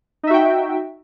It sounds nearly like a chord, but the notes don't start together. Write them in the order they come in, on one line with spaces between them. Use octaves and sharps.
D#4 E5 F#4 G5